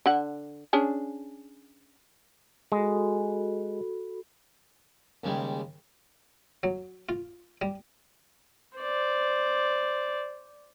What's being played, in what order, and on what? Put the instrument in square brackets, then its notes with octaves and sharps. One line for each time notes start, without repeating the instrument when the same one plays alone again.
[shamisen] D3 F#5
C#4 D4 G#4
[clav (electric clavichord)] G#3 [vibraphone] F#4 A4 B5
[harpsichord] D#2 C#3 G3 G#3
F#3
F4
G3
[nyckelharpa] C5 D5